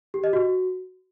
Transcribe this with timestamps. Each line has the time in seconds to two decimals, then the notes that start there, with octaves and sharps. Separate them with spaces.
0.14 G4
0.24 D#5
0.33 F#4